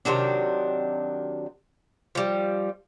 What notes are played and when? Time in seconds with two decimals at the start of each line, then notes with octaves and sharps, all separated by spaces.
0.05 C3 D#3 F#3 D4
2.15 F3 G3